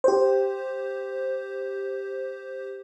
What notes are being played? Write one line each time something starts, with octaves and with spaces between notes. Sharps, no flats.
G4 C5